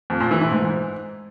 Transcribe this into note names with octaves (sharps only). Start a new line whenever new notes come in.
F2
A#2
E3
E3
G#2